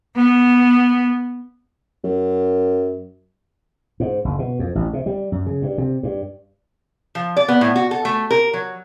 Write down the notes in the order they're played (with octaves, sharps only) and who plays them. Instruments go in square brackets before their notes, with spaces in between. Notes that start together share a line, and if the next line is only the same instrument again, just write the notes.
[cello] B3
[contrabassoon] F#2
[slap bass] G#2
F#1
B2
F2
A1
C3
G3
F#2
C#3
G2
C3
G2
[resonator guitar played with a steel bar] F3
D5
B3
A2
F#4
A4
A3
A#4
F#3